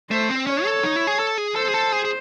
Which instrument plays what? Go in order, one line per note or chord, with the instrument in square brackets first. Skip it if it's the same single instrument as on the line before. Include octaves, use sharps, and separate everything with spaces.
[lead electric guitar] A3 [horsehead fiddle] C5
[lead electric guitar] C4
[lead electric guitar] C#4 [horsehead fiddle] C#5
[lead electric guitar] A4
D#4
E4
G#4
A4
G#4
[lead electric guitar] A4 [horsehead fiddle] C5
[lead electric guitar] G#4
A4
G#4
G#4